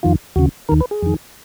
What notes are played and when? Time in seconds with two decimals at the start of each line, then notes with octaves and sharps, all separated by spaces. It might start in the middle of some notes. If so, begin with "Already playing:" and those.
0.03 F2 D#3 F4
0.36 D#2 C#3 F#4
0.69 D#2 D#3 A#4
0.80 B4
0.91 G#4
1.02 F2 D#3